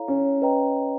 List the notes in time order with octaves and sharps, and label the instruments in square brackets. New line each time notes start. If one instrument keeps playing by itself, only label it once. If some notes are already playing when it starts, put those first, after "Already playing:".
Already playing: [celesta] E4 A4 C#5 F5 A#5
[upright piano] C#4
[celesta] B4 D#5 G5 A#5